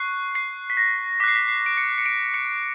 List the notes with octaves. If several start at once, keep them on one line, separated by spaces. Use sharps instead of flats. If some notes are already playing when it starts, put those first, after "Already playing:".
Already playing: C#6 F#6 C7
C7
B6
A#6
D6 F#6 B6 C7
B6
C7
D7
C#7
C#7
D7
C#7